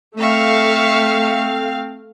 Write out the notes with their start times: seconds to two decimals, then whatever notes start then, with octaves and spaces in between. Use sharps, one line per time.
0.18 A3 C4 E5 F5 C#6